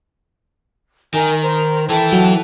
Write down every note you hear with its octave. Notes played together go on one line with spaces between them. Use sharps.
D#3 A#4 G#5
A#4 C5
E3 E4 A4 G5 A5
F#3